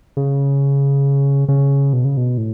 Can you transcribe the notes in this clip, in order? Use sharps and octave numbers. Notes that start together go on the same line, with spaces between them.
C#3
C#3
B2
C#3
B2
A2